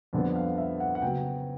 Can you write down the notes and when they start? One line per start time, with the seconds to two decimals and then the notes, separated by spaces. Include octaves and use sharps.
0.13 F2 D3 G3 B3
0.36 F5
0.58 E5
0.80 F#5
0.95 F#5
1.02 C#3 F#3 B3 G5